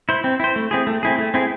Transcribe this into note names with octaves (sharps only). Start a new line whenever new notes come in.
E4 C5
C4
E4 C5
A3
C4 E4 G#4
A3
C4 E4 G#4
A3
C4 E4 G#4